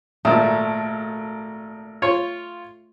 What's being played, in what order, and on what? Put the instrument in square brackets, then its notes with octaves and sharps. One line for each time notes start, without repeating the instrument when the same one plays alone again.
[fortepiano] G#1 A#2 [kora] A3
[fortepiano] F4 C#5